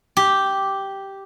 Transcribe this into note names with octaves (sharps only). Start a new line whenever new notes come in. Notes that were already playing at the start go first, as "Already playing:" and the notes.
G4